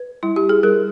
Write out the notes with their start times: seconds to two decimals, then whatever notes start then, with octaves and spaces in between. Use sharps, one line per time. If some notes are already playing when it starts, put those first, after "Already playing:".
Already playing: B4
0.23 G3 E4
0.36 G4
0.49 G#4
0.63 G3 A#4